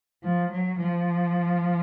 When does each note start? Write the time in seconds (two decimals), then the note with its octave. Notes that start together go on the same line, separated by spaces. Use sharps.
0.23 F3
0.52 F#3
0.80 F3